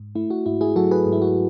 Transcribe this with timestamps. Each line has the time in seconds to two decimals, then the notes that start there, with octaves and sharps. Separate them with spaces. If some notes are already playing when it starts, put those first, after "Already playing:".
Already playing: G#2
0.15 A3 E4
0.30 F#4
0.46 G#2 E4
0.61 E4 G#4
0.76 F#3 F#4 A4
0.91 G#4 B4
1.06 G#2
1.12 E4
1.22 F#4